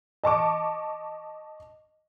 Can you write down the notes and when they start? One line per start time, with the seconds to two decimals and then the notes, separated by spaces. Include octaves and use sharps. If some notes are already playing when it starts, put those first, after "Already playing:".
0.24 D#5 A5 C#6 D6